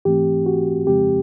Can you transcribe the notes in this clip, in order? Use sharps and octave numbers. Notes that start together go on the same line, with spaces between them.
G#2 E3 A3 C4 G4
F#4
F2 C#3 F3 G#3 C4 G4